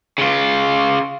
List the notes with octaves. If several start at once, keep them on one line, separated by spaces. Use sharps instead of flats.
C#3 F4